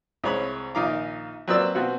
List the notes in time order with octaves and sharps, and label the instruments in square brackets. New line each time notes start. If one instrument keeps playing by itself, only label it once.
[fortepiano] C2 G#3 C#5 B5
A#1 D#3 D#4 F5 A#5 D6
F#3 A#3 C4 B4 D5 E6
B2 C4 F#4